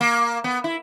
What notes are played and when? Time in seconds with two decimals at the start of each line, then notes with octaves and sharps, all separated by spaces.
0.01 A#3
0.44 B3
0.64 E4